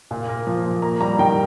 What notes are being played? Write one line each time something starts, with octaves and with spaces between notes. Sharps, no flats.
A#2
A#3
F3
A#2
A#3 A#5
G3 A#5
D#3 G5